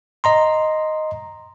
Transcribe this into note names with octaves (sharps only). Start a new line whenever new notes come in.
D#5 A#5 C6